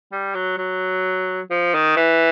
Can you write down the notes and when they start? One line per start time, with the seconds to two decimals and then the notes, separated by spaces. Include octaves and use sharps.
0.12 G3
0.35 F#3
0.58 F#3
1.50 F3
1.74 D#3
1.96 E3